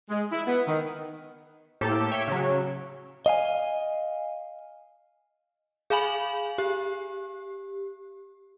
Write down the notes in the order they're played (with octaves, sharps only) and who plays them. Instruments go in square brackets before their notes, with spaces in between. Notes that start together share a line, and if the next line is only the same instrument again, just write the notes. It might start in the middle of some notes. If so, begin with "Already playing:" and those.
[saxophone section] G#3
E4
B3
D#3
[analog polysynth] A2 A#3 G4 A4 G6 E7
C#5 E5 G5
C#3 F#3
[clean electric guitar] D#5 F5 G#5
[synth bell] G#4 F5 G#5 B5 F#7
G4